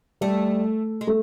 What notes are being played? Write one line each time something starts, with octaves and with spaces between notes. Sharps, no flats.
G3 A3
G#3
A3